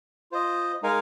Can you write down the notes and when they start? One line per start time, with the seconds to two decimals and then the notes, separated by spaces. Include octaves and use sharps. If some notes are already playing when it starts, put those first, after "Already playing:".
0.32 F4 C5 D#5
0.83 G#3 D#4 A#4 F5 G#5